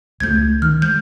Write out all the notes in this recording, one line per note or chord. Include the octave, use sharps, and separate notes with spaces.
C#2 G3 A3 G6 G#6
D#3 F6
G#3 G6